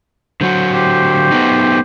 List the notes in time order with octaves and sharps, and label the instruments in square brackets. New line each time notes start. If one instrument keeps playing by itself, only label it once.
[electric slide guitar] D3 F#3 F#4 [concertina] C5
[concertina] G4 C5
[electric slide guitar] A3 B3 D#4